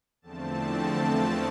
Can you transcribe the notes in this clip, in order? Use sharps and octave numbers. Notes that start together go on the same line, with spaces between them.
E2 D3 F3 A3 C4 A5